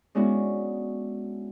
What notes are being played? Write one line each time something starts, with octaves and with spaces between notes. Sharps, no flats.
G#3 B3 C#4 D4 E4 F#4